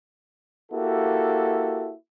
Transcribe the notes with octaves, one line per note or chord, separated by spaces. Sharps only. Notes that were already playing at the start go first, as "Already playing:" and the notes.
A#3 E4 F#4 G4 A4